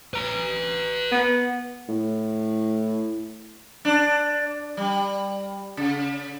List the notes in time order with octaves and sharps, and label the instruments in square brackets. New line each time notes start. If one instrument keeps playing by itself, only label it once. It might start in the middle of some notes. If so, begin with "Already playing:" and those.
[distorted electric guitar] B4 A#5
[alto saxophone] B3
[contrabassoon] A2
[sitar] D4
G3
C#3